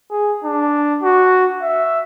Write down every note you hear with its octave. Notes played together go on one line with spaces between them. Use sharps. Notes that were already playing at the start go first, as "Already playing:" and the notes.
G#4
D4
F#4
E5